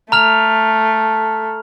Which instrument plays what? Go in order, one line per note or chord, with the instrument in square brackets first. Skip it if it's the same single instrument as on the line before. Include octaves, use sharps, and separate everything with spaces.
[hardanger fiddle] A3 [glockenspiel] A#5 F6 F7